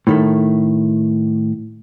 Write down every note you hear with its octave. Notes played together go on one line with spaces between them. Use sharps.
A2 D#3 A3